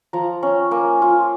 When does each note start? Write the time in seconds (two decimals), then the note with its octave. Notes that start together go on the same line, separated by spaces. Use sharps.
0.13 F3 A#5
0.43 C#4
0.71 A#3 G#5
1.02 F4